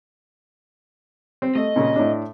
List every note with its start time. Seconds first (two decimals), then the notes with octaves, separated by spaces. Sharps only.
1.42 C4
1.55 A3 D#5
1.76 A#2 C#3
1.96 A2 D4